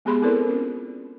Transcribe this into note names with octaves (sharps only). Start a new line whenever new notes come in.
G#3 B3 G4 G#4 B5 C6
C4 E4 A4 A#4 C5 D5
C#4 F4